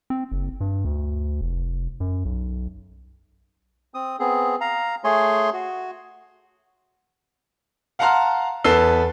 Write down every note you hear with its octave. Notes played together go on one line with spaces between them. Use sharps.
C4
F#1
G2
D2
F1
F#2
B1
C4 D#6
B3 C4 G#4
F5 A#5
A3 G#4 C#5 G#5 C6
F#4
F5 F#5 A5 A#5 C6 F6
E2 A4 B4 E6 C7 G7